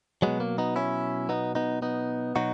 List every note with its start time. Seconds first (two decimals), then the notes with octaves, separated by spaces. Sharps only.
0.22 B2 F#3 G#3 B3
0.40 A#3
0.58 B3 D#4
0.76 C#4 E4
1.29 B3 D#4
1.55 B3 D#4
1.82 B3 D#4
2.36 B2 F#3 D#4 F#4